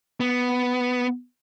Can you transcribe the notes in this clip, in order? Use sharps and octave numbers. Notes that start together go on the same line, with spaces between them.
B3